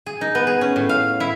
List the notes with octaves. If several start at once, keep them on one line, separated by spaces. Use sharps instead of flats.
G#4
D#4
B3
G#4
C#4
A2
F5
E4